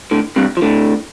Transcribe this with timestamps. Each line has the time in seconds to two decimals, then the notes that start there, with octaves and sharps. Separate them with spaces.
0.11 A2 D3
0.36 G2 C3
0.57 F3
0.62 A2 D3